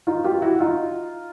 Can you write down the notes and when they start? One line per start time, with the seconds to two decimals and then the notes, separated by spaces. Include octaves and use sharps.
0.07 D#4 F4
0.24 F4 G4
0.42 E4 F#4
0.60 D#4 F4